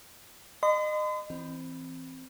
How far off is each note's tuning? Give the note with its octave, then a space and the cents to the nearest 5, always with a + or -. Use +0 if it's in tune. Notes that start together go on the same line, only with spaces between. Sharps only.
D#5 -25 C6 -45
E3 +0 C4 +0